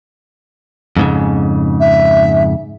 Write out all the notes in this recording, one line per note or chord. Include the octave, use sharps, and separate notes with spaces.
F2 G#2 C#3
E5